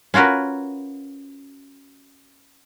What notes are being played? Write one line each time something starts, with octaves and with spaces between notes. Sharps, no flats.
C#4 F4 F#4 A#4 B4